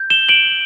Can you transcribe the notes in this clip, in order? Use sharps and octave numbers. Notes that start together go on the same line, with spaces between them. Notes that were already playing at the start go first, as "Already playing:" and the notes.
Already playing: G6
E7 G7
D7 F#7